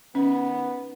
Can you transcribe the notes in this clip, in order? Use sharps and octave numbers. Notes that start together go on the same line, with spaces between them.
D#3 B3 C#4